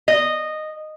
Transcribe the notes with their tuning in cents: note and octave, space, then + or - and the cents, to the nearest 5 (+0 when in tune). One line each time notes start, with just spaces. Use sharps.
D#5 -10